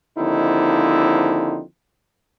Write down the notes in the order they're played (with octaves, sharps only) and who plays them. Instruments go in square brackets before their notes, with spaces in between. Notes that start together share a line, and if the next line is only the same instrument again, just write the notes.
[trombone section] D#2 D3 F3 C4 D#4 E4